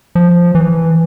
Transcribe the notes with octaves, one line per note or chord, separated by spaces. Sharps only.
F3
E3